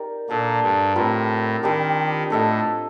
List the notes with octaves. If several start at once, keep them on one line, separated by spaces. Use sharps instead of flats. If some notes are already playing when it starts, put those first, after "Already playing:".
Already playing: D#4 G4 A#4 D5
A#2 A#3 D4 A4 D5
G2
A2 G3 C4 F4 A#4
D#3 G3 A#3 D4 G4
A2 D4 A4 D#5